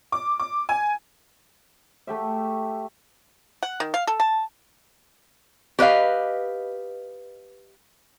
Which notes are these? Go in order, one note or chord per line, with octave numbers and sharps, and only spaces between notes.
D6
D6
G#5
A3 G4 E5
F#5
D#3
F5
A4
A5
G4 B4 D#5 F5